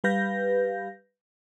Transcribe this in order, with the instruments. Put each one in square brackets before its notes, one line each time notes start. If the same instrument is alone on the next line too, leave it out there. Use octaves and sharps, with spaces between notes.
[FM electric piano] G3 G4 B4 F5 G6 A#6